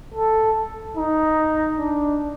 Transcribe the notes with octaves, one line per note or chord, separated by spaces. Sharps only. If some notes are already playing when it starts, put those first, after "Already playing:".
A4
D#4
D4